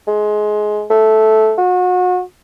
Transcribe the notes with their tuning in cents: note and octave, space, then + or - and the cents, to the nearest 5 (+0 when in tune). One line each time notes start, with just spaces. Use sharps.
G#3 +20
A3 -10
F#4 -35